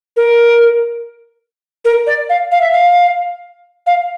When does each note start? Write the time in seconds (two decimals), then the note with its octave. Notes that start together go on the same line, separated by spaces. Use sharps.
0.17 A#4
1.85 A#4
2.07 D5
2.29 F5
2.52 F5
2.61 E5
2.72 F5
3.87 F5